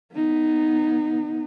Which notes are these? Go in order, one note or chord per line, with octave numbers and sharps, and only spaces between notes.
B3 D#4